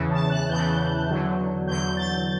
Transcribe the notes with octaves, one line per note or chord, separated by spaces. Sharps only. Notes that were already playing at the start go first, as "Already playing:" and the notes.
Already playing: E2 C#3 E3
A5
F#6
E2 C#3 E3 G6
E2 D3 F#3
E2 D3 F#3 G6
A6